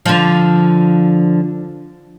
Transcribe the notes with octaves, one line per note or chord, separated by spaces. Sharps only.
D3 F3